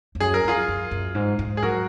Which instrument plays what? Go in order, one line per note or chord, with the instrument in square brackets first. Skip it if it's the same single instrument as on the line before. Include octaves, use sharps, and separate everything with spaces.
[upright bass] F2
[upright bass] F#2 [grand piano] G#4
[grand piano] A#4
[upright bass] F#2 [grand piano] F4 G#4
[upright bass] F#2
F#2
G#2
G#2
[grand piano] G#4
[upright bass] F#3 [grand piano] F#4 A#4